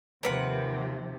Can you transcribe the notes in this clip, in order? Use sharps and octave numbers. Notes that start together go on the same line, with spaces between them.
D#2 C3 F3 A#4 B4 F#5